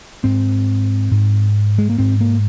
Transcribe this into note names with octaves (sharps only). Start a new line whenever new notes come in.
G#2 C4
G#2
G#3
A#3
G#2 C4
A#3